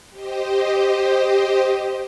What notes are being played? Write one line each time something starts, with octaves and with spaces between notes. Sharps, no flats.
G4 C5 D#5